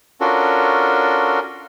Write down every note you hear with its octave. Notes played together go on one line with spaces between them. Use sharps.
C#4 D4 F4 F#4 A4 A#4